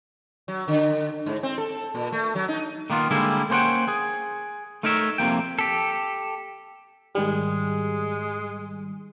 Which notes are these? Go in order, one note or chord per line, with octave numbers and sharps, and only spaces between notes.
F#3
D3
G#2
C4
A4
A#2
A3
F#3
D#4
D#3 A#3 B3 F4
D3 G3 G#3 A#3 E4
A#3 C#4 C5 D5 F#5 G5
G#4
A3 D#4 A#4 C#5 E5
F2 C3 A#3 G5
G4 A4
G#2 D#3 G3 G#3